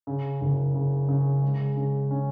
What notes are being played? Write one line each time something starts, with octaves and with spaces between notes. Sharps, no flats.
C#3
F#1
C#3
C#3
G#3
C#3
C#4